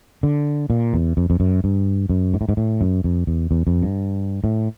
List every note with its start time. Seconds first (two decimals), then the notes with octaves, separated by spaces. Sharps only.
0.23 D3
0.70 A#2
0.93 E2
1.17 F2
1.30 F2
1.40 F#2
1.64 G2
2.10 F#2
2.34 G#2
2.41 A2
2.49 G#2
2.57 A2
2.81 F#2
3.04 F2
3.27 E2
3.51 E2
3.67 F2
3.82 G2
4.44 A2